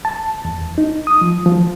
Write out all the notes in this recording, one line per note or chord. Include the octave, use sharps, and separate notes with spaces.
A5
E2
D#4
D#6
F3
F3